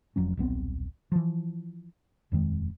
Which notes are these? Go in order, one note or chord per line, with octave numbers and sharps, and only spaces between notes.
F1 F2 F#3 C#4
D#1 B1 B3 C4
E3 F3
D#1 F2 D#3 G#3